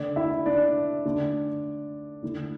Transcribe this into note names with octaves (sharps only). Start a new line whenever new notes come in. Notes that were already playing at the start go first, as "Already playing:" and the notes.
Already playing: D3 A3 D4 D5
E4 E5
D4 D5
D3 A3 D4
D3 A3 E4